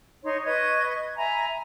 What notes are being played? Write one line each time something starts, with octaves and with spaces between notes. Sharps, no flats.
D#4 C#5 C6
B4 D#5 C#6 G#6
E5 G#5 A#5 B5